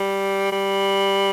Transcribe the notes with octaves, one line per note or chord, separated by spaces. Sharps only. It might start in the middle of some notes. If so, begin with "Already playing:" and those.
Already playing: G3
G3